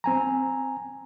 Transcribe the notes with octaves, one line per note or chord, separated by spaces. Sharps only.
C4 G#5 A#5